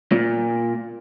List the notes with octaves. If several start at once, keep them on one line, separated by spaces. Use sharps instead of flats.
A#2